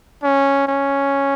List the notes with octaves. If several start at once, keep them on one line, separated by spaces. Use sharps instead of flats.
C#4
C#4